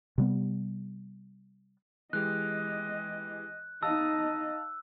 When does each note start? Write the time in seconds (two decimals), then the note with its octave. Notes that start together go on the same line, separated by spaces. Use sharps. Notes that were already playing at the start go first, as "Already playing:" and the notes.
0.18 C3 G3 B3
2.13 E3 G#3 G4 D#5 F#6
3.83 D#4 D#5 F5 A5 E6